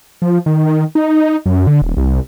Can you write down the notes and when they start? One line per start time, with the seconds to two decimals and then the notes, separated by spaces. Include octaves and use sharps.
0.22 F3
0.46 D#3
0.95 D#4
1.46 F#2
1.67 D3
1.82 D#1
1.97 C2